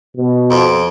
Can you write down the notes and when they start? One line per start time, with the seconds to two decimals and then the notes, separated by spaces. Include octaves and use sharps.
0.16 B2
0.51 F2